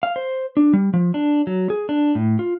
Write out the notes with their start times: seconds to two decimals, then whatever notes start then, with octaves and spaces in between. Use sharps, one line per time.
0.03 F5
0.16 C5
0.57 D4
0.73 G3
0.94 F3
1.14 D4
1.47 F#3
1.70 G#4
1.89 D4
2.15 A2
2.39 F4